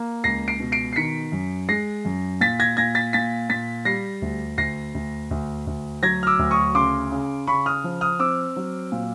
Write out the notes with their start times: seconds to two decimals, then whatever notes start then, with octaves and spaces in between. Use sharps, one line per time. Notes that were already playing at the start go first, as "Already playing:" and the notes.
Already playing: A#3
0.24 C#2 A#6 C7
0.48 C7 D7
0.60 B2
0.72 C7 D7
0.93 C7
0.96 D#3 B6 C#7
1.32 F#2
1.69 G#3 A#6 C7
2.05 F#2
2.41 A#2 A6 B6
2.60 G#6 A#6
2.77 A#2 G#6 A#6
2.95 A6 B6
3.13 A#2 A6 B6
3.50 A#2 A6 B6
3.85 G3 A#6 C7
4.22 D2
4.58 D2 A#6 C7
4.95 D2
5.31 D2
5.67 D2
6.02 F#3 G#6 A#6
6.23 F6
6.27 D6 E6
6.39 D2
6.51 C#6 D#6
6.75 C#3 C6 D6
7.12 C#3
7.47 C#3 B5 C#6
7.66 D#6 F6
7.84 F3
8.01 D#6 F6
8.19 C4 D6 E6
8.56 F#3
8.92 A#2